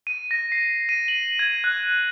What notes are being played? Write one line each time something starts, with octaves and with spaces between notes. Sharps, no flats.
D#7
A#6
C7
D#7
F#7
G#6
F#6